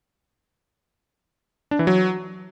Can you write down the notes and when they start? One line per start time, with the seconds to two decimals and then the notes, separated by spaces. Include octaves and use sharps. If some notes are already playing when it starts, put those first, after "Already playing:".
1.71 D4
1.79 E3
1.87 F#3